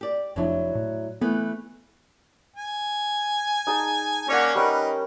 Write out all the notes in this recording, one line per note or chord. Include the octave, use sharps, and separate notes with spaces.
G4 D5
F1 F3 F#3 D4 E4
A2
E3 A3 B3 B4
G#5
D#4 G#4 A5
A#3 C#4 C#5 D5 F#5
G3 C#4 D#4 A#4 B4